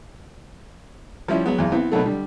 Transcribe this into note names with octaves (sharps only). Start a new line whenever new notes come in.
F3 G3 C#4 E4
F#3 G#3 B3
B1 E2
E3 B3 C4
B2 D#3 F#3 A3
D3 G3